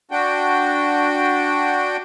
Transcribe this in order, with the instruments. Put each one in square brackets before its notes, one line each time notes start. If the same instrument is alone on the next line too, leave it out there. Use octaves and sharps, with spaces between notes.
[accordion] D4 F#4 G5